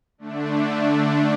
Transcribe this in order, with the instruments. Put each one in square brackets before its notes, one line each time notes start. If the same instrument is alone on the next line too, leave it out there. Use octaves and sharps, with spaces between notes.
[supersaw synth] D3 A3 D4